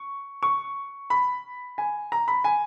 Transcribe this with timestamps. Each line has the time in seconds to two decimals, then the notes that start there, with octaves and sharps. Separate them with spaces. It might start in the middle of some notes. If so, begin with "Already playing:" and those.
Already playing: C#6
0.43 C#6
1.10 B5
1.78 G#5
2.12 A#5
2.28 B5
2.44 G#5